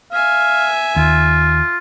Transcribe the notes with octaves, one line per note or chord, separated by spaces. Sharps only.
E5 F5 G#5
D#2 F4